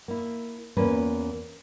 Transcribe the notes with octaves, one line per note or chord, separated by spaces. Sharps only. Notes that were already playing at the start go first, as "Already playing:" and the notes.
A#3 E4
E2 A#3 C#4 F4 B4